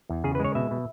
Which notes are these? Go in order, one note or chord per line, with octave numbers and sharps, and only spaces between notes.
E2
C#3 G#4
B4
G#3 C#5
B2 E5
B2